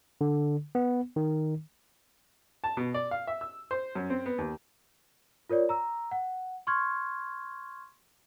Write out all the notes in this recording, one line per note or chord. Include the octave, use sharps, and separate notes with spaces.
D3
B3
D#3
A5
B2
D5
F5
E5
E6
C5
F#2
C4
B3
D#2
F4 A#4 C#5 D5
A#5 E6
F#5
C6 C#6 F6 G#6